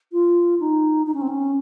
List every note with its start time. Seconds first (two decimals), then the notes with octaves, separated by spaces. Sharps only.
0.12 F4
0.60 D#4
1.06 D#4
1.14 C#4
1.22 C4
1.29 C#4